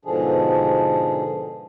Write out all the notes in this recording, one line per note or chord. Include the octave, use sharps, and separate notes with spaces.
G#2 B2 D3 F3 D4 G#4